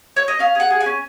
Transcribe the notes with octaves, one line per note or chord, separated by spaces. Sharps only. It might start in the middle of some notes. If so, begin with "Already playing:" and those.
C#5
D#5
C#4 F5
G#4 F#5
G#4
G#5
C#4